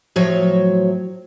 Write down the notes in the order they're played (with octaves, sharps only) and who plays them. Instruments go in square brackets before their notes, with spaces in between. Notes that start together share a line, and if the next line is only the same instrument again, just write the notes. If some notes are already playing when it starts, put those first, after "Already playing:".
[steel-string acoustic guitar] A2 F3 F#3 C#5